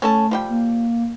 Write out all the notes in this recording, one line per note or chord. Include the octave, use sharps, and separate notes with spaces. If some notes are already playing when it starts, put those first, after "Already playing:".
A3 C#4 A4 A5
F3 G3 G5
A#3